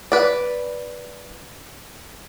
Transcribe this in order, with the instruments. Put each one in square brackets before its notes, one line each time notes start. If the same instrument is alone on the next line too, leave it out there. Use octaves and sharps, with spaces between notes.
[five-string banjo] B4 D5